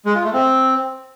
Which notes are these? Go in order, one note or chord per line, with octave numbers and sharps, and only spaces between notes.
G#3
F4
A3
C4